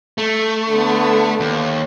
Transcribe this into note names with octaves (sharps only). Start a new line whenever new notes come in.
A3
D3 B3
D#2